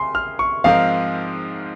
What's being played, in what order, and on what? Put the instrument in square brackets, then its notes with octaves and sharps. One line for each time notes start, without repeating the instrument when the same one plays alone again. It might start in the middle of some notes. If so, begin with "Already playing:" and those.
Already playing: [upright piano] C#3 [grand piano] G#5 C6
[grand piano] F6
C#6
[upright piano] G#2 F3 C4 D#4 A#4 [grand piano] F5